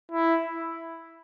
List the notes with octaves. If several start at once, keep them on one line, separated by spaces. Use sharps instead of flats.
E4